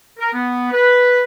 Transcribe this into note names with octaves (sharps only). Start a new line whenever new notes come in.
A#4
B3
B4